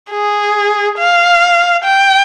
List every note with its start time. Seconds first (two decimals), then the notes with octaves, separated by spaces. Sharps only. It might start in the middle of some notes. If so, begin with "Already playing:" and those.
0.10 G#4
0.98 F5
1.84 G5